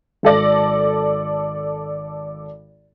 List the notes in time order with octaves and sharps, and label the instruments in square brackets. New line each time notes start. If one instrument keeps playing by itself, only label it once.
[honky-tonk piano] G#1 A4 D5 A#6